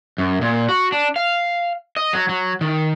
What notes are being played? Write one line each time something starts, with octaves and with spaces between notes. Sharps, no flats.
F#2
A#2
F#4
D4
F5
D#5
F#3
F#3
D#3